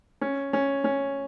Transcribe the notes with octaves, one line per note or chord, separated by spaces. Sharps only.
C#4
C#4
C#4